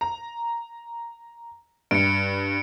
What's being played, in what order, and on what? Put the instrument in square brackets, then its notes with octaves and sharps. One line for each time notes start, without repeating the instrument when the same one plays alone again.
[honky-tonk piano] A#5
[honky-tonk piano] G2 [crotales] C#7 D7